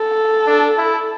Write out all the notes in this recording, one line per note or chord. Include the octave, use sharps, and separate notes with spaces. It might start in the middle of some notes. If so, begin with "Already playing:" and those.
Already playing: A4
D4
E4